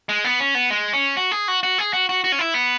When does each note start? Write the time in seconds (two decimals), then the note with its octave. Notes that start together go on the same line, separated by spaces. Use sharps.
0.09 G#3
0.24 B3
0.40 C#4
0.55 B3
0.70 G#3
0.93 C#4
1.17 F#4
1.31 G#4
1.48 F#4
1.63 F#4
1.78 G#4
1.93 F#4
2.09 F#4
2.24 F#4
2.32 C#4
2.39 E4
2.54 B3